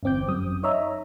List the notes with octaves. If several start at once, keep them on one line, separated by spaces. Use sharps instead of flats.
G1 E2 C4 D6 G6
F#2 D#6
D#4 C#5 D#5 E5 A#5